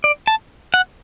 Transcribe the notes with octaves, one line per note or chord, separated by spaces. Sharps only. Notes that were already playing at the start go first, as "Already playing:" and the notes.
D5
A5
F#5